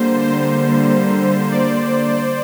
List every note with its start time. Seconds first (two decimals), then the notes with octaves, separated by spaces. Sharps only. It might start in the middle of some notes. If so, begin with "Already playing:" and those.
Already playing: D3 G3 A#3 C5
0.22 C5
1.51 D5